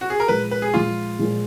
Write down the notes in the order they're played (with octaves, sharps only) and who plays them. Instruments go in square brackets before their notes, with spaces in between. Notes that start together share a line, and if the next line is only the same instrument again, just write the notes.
[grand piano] F#4
G#4
A#4
[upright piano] A#2 F3 G#3 [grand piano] B4
[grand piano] B4
G#4
[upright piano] A#2 F3 G#3 [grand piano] F4
[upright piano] A#2 F3 G#3